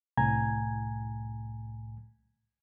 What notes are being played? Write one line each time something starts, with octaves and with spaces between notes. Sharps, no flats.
C2 A2 G#5 A#5 G#6